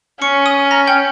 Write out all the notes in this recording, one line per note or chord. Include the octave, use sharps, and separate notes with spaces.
C#4 C#6 C#7
D#6 D#7
A#5 A#6
G5 G6